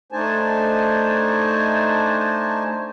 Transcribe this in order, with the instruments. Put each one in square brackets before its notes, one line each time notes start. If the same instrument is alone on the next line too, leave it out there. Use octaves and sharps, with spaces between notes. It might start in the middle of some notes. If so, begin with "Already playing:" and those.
[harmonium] A3 D4 D#4 C5 G#5 A5